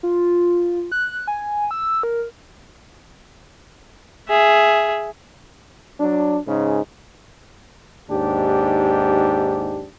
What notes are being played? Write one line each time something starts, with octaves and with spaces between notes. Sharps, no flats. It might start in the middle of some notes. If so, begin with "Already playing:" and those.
F4
F#6
G#5
E6
A#4
G#4 E5
F#3 D4
G#2 C#3 D#4
D#2 G#2 D4 G4